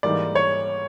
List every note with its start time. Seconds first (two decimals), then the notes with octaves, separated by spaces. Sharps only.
0.03 G#2 E3 G3 A#3 D#4 D5
0.35 C#5